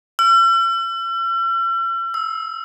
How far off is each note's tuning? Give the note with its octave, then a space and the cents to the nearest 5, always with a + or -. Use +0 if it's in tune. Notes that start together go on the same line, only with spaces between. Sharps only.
E6 +45
E6 -10